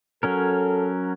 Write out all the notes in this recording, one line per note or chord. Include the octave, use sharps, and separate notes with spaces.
F#3 C#4 A4 A#4